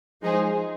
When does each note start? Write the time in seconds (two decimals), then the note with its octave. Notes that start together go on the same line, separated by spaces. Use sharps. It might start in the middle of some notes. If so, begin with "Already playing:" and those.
0.21 F3 G#3 D#4 G#4 C5